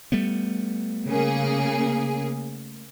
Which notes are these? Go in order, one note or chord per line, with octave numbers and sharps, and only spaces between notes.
G3 A3 B3
C#3 A#3 G#4